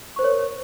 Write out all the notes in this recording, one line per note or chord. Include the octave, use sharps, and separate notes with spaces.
A#4 C5 C#5 C#6